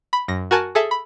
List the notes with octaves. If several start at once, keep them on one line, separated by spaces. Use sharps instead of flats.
B5
F#2 A#6
F#4 A#4 G#5 A5 F#6
G#4 A4 E5
B5